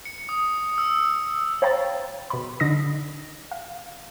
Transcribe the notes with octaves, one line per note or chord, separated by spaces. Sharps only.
C#7
D#6
E6
C5 C#5 F5 G5 A#5 A6
B2 B5
D3 D#4 D#6 A#6
F5